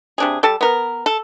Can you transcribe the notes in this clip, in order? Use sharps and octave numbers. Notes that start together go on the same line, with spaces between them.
C3 D4 G#4
G3 A4 A5
B3 A#4
A4